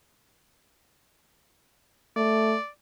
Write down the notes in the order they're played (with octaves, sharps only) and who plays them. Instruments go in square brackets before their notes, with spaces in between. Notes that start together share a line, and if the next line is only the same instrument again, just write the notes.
[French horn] A3 [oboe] D5